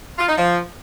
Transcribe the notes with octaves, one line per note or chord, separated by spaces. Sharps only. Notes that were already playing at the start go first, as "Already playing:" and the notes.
F4
D#4
F3